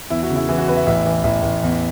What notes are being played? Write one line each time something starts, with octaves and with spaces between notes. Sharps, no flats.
E2 E4
F#4
C#3
E4
E3 E4
F#4
E2 B4
E5
A1 E5
E3
A1 E5
A1
E2